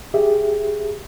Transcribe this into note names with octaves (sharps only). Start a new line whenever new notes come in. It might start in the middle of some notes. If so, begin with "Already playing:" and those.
G4 G#4 E5